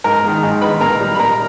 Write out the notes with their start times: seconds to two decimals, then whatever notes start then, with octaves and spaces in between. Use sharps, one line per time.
0.04 G#2 A#4 A#5
0.24 D#3 G#3
0.43 G#2
0.61 D#3 G#3 B4 B5
0.80 A#2 A#4 A#5
1.00 G3
1.15 B5
1.19 A#2 A#4 A#5